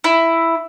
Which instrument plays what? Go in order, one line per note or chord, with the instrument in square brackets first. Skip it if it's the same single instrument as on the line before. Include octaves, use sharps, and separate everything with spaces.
[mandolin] E4